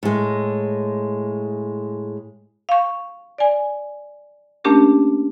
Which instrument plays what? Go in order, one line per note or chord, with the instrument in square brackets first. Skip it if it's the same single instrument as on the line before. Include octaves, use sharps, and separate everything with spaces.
[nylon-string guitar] A2 G#3
[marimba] F5 C#6
D5 G#5
A3 A#3 C#4 D4 G4 A#4